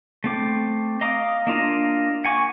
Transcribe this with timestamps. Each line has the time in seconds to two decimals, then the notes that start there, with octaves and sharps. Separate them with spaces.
0.24 A3 C4 D6
1.01 D#5 F5 A#5 D6 D#6
1.47 A#3 D4 F4 D#5
2.25 F#5 G#5 C#6 D6